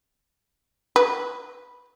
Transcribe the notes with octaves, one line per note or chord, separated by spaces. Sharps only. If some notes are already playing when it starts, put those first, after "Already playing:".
B4